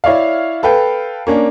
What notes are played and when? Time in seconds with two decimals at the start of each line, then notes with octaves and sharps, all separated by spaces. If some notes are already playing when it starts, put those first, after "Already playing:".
0.04 E4 C#5 D5 F5
0.63 A4 B4 F5 G5
1.27 A#3 C#4 D4